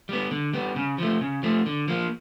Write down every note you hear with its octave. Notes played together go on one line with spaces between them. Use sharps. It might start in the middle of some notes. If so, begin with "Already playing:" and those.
G3 B3
D3
G3 B3
C#3
F3 A3
C#3
F3 A3
D3
F3 A#3